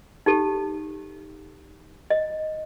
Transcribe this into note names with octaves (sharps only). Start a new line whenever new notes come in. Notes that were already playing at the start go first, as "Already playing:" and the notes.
D#4 G4 A4
D#5